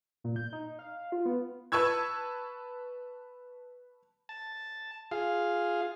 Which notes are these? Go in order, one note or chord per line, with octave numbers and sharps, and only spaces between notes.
A#2
G6
D#4
F5
F4
B3
B4 A5 C#6 E6 G#6
A5
F4 G#4 F5